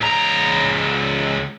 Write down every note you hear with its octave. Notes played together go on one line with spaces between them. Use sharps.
C#2 A#5